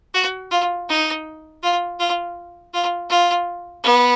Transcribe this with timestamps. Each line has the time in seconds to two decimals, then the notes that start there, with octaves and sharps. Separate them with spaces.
0.14 F#4
0.51 F4
0.89 D#4
1.63 F4
1.99 F4
2.74 F4
3.10 F4
3.84 B3